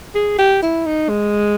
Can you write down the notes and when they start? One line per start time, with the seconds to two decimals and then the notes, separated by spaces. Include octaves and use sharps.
0.15 G#4
0.39 G4
0.62 E4
0.86 D#4
1.09 G#3